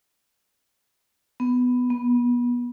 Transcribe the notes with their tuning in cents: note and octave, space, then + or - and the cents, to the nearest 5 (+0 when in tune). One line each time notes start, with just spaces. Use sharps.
B3 +10
B3 -30